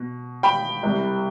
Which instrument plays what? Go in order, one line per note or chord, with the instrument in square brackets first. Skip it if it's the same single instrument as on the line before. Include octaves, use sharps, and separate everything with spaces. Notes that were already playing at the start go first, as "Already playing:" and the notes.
Already playing: [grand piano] B2
G5 B5
C2 C3 G3